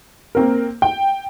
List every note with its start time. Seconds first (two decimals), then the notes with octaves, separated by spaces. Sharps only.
0.35 A#3 C4 A#4
0.82 G5